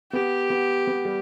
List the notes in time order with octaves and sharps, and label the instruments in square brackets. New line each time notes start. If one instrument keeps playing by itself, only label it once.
[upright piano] B3 [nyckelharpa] G4
[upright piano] B3
B3
G3